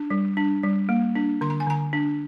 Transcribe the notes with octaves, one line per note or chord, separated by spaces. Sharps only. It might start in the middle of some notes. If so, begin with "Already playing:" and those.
Already playing: D4
G3
D4
G3
A#3
D4
D3 C6
A#5
G#5
D3 A#5
D4